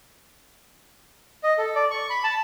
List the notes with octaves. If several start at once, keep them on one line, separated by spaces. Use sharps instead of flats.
D#5
A4
D5
C#6
B5
A5